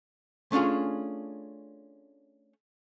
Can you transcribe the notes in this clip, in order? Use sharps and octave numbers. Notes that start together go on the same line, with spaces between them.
A3 C#4 D4 F4 G#4